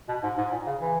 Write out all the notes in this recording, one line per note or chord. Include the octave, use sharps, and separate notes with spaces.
B2
G#2
G#2
A#2
C#3
E3